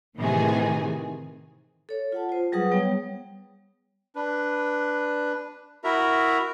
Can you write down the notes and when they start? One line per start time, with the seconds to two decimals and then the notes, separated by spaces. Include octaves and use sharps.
0.17 A2 C3 D#3 E3 G#4
1.89 A4 C#5
2.12 F4 F#5 A5
2.29 F4 C5
2.52 F#3 G3 G#4 B4 F#5 D#6
2.72 G3 B3 C#5 G5
4.15 D4 B4
5.84 E4 F#4 A#4 E5 A#5